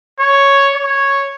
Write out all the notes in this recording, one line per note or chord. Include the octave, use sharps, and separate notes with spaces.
C#5
C#5